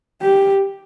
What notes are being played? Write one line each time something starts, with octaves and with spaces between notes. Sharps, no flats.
G4